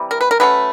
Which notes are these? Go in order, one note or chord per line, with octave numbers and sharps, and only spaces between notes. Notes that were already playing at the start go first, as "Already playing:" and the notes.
Already playing: C3 E3 G3
A#4
B4
A#4
F#3 A3 C#4 B4